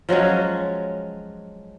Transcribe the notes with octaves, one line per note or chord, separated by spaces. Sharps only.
F3 F#3 G#3 C#4